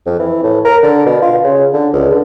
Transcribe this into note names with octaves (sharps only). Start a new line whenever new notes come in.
F2
E3
A2
A#4
D3
B2
F4
C#3
D3
C#2
D3